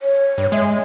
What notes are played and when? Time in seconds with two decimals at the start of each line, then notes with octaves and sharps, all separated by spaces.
0.01 C#5
0.38 G2
0.52 G#3 E5